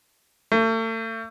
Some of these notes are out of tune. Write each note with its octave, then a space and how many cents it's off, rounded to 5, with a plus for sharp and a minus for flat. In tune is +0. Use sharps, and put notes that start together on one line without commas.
A3 +40